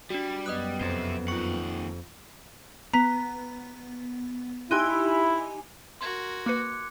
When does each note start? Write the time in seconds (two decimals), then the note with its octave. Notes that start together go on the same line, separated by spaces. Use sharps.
0.10 G3 D4 F#4
0.46 F#2 B3 D#5 D#6 F#6
0.81 F2 C3 C5
1.28 D#2 F4 F#5 C#6
2.94 B3 A#5 B6
4.71 D#4 E4 G4 G#5 C6 F#6 D#7
6.01 F#4 A#4 C6 G#6
6.46 A#3 B4 D6 F#6 C#7